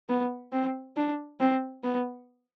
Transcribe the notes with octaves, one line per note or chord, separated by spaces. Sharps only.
B3
C4
D4
C4
B3